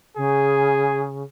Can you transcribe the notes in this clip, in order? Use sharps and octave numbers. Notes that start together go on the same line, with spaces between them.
C#3 G#4